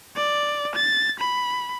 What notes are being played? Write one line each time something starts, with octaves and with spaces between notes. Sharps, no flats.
D5
A6
B5